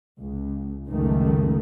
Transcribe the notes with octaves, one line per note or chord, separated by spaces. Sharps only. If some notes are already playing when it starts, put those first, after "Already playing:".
C#2
C#2 F#2 D#3 A3